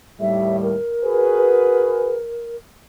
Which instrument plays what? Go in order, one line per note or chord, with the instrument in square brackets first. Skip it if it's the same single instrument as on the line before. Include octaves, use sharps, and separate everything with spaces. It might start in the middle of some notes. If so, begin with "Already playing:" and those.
[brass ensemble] D#2 A2 G3 [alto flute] E5
[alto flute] A#4
[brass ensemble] F#4 G#4 B4